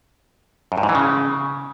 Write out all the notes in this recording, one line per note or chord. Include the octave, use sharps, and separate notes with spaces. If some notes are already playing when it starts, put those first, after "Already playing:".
F#2
G2
G#2
E3
C#3